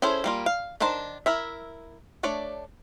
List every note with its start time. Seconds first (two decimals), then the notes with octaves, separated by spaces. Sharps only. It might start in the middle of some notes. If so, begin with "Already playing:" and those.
0.02 C#4 E4 G#4 A4 C5
0.24 G3 A#3 F4
0.46 F5
0.80 D#3 D4 A#4 C5 A5
1.26 E4 A#4 E5
2.23 A3 D4 C#5 D5